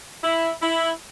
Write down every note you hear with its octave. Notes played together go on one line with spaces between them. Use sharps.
E4
E4